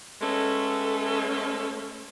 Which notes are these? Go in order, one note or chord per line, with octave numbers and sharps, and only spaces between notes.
G#3 A3 B3 C#4 A4